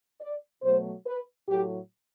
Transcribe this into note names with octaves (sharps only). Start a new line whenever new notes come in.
D5
B2 F#3 A3 C5
B4
A2 F#3 A3 G4